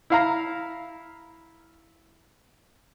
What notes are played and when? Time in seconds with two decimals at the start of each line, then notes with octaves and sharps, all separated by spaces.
0.10 E4 F5 A#5